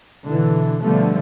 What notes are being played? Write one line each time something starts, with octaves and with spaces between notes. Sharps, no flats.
B2 D3 E3
B2 D3 F3 G3 A3 B3